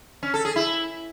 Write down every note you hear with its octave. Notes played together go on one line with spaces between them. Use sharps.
C#4
A4
G#4
E4